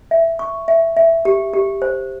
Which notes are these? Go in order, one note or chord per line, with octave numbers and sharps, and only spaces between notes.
E5
C#6
E5
E5
G4
G4
C5